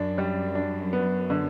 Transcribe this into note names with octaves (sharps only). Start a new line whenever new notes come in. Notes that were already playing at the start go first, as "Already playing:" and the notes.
Already playing: F#2 D4
G3
D4
B3
D3